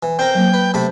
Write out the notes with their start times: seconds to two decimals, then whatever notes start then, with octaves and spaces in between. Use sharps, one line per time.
0.03 E3
0.19 C4 A#4 G5
0.35 F#3 A#3
0.54 B4
0.74 C3 A3 B5